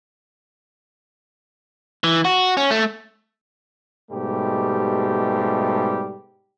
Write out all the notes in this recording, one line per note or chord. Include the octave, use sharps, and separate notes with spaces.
E3
F#4
C#4
A3
G#2 B2 G3 A3 G4